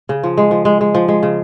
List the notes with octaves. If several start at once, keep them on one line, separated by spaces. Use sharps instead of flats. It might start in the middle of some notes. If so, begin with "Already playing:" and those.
C#3
F3
G#3
F3
G#3
G#3
F3
G#3
C#3